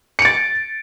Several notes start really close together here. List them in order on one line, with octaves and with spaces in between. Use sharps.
C#7 D7 A6